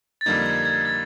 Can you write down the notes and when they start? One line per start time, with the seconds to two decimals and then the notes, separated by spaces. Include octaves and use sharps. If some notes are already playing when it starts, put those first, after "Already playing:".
0.21 A6
0.26 F2 D3 G3 A#3 D#4 G#6
0.46 G#6
0.65 G#6
0.85 A6